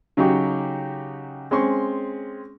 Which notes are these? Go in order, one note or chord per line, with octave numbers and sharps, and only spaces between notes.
C#3 F#3 D#4 F#4 G4 C#6
G#3 C4 C#4 C6 C#6